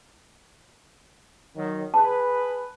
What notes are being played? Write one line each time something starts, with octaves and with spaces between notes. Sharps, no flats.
D#3 F#3
G#4 B4 A5